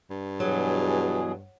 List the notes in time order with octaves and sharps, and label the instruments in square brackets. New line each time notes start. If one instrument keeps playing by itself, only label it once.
[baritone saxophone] G2
[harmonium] B2 E3 G#4 [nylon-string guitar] F#3